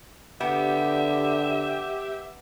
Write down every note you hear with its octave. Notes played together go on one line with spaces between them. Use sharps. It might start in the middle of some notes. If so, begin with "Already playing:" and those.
D3 B3 G4 E5